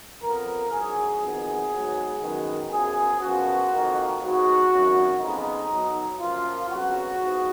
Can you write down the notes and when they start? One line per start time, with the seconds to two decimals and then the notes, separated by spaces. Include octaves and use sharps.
0.22 F2 F3 B3 A#4
0.71 A#1 G#2 F#3 G#4
1.21 F2 D#3 F#3 B3
1.72 G#2 F#3 B3
2.21 F#2 D#3 G#3 B3
2.71 F#2 F3 B3 G#4
3.21 F#2 C#3 F3 B3 F#4
3.70 F2 D#3 A#3
4.20 G#2 F#3 B3 F#4
4.70 G#1 F#2 C#3 F#3
5.20 F2 C#3 G#3 B3 D#4
5.70 B1 B2 F#3
6.20 F#2 F3 A#3 F4
6.69 F2 C#3 F#3 B3 F#4
7.19 G#2 F3 B3